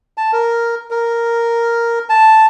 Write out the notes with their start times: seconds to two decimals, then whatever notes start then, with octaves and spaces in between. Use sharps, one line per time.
0.18 A5
0.33 A#4
0.91 A#4
2.10 A5